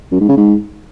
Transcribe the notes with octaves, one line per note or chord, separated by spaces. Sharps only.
F#2
G#2
C#3
G#2